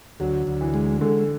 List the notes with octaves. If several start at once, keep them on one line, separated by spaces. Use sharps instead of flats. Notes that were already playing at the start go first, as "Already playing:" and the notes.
D2 F#3
D2
E3
G#3
D3 G#3